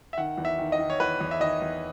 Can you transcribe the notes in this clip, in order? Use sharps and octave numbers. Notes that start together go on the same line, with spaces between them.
E5
D#3 F#5
E2
E5
D#3
D#5
D#3
C#5
E2 B4
E2
E5
D#3 D#5
E2